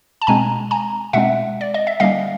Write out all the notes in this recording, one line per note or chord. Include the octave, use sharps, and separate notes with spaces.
A5
B2 G#3 C4 G#5 A#5
G#5 A#5
B2 G#3 C4 E5 F#5
D5
D#5
E5
D3 G3 A#3 C#4 D#5 F5